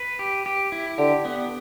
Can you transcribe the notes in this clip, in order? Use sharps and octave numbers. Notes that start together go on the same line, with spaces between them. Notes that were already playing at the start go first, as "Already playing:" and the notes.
Already playing: B4
G4
G4
E4
D3 G4
B3